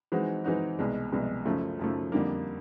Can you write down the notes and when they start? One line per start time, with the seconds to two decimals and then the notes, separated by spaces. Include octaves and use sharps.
0.12 E3 G#3 C4 D#4 F#4
0.44 E3 G#3 C4 D#4 F#4
0.79 C2 B2 G#3
1.12 C2 B2 G#3
1.45 F#2 C#3 F3 A3
1.79 F#2 C#3 F3 A3
2.12 F2 D3 G3 A#3